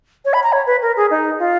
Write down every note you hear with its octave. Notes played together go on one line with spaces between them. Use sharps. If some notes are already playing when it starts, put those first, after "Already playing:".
C#5
B5
A#5
C#5
B4
A#4
G#4
D#4
F4